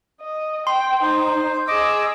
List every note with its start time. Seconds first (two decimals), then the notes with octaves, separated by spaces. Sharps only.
0.20 D#5
0.67 G5 C6
1.03 D#4 C5
1.68 G#4 D#5 D6 E6